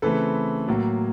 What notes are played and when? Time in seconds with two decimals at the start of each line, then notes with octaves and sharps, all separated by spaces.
0.02 C#3 E3 A3 C4 A4 B4
0.68 A2 F#3 A#3